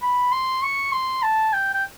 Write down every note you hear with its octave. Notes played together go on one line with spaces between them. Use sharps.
B5
C6
C#6
C6
A5
G5
G5